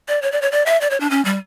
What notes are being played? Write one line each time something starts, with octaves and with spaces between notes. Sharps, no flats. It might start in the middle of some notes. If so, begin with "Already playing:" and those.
D5
C#5
D5
C#5
D5
E5
D5
C#5
D4
C#4
G3